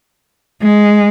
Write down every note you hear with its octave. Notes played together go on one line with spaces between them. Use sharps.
G#3